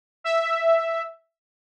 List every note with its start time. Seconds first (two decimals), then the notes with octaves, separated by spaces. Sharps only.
0.24 E5